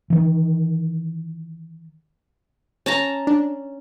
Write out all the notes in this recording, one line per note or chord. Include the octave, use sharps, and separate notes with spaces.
D#3 E3
C#4 A5 A#5
D4